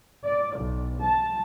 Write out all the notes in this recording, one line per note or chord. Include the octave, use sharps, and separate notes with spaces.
D5
B1
A5